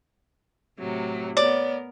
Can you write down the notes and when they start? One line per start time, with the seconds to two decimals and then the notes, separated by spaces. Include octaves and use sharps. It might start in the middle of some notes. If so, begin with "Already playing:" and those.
0.78 A2 C3 F#3
1.37 B3 A#4 C#5 D5